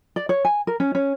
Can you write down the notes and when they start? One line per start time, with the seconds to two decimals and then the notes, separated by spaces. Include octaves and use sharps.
0.16 D5
0.29 C#5
0.45 G#5
0.67 A#4
0.80 C#4
0.95 C#4